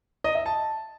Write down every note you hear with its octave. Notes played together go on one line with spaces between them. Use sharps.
D#5
E5
A5